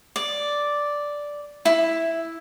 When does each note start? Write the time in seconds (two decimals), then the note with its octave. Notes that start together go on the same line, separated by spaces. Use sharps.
0.16 D5
1.65 E4